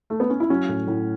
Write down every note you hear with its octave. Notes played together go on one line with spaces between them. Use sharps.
A3
B3
C#4
E4
F#3 C#4 F#4
A2
A2